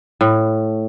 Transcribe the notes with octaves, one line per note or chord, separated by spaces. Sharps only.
A2